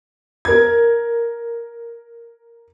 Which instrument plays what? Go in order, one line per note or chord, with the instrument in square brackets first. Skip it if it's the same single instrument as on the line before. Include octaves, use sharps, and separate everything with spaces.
[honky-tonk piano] A#4 G#6